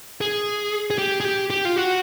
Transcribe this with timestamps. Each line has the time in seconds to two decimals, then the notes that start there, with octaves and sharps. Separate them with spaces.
0.21 G#4
0.90 G#4
0.98 G4
1.20 G#4
1.25 G4
1.50 G4
1.65 F4
1.76 F#4